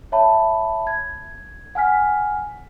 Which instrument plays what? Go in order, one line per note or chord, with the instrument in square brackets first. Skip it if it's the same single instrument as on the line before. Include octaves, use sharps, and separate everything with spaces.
[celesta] C#5 E5 A5 B5
G#6
F#5 G#5 F6 B6